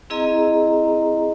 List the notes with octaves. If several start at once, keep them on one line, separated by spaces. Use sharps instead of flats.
C4 E4 G#4 D#5 A#5